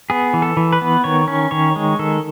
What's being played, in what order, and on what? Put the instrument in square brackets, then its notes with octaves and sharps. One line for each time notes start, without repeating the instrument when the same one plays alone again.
[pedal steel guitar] B3 G#4
E3
A4
E3
B4
B3
D#3 C#5
C#4
D#3 C#5
G#3
D#3 A4